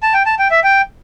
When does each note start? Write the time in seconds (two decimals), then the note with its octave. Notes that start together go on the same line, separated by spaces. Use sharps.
0.03 A5
0.14 G5
0.26 A5
0.39 G5
0.51 E5
0.64 G5